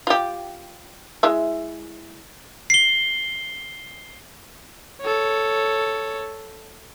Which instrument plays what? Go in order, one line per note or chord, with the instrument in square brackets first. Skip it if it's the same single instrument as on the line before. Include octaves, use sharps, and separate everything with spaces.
[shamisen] F4 G4
G#3 E4 E5
[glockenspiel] C7 G7
[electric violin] A4 C#5